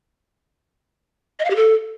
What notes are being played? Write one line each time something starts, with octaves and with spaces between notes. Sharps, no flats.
D#5
F5
G4
A4